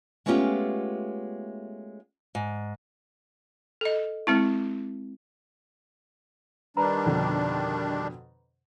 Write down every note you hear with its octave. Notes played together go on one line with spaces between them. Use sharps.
G#3 A3 B3 C#4 F4 G4
G#2
A4 D#5
G#3 C4 E4
D#3 G3 D4 B4 A#5 B5
F2 B2 D3